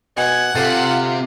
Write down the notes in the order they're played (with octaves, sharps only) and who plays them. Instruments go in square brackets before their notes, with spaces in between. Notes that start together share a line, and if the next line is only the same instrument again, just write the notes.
[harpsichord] B2 [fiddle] F#5 [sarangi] G#5
[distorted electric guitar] C3 [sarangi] F4 [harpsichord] A4 C5